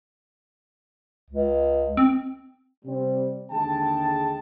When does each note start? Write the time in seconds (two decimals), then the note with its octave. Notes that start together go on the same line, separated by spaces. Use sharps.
1.30 C#2
1.97 C4
2.85 C3 G3 C4
3.51 D#2 D3 G#3 G#4 G5 A5